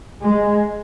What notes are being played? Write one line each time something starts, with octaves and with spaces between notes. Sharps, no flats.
G#3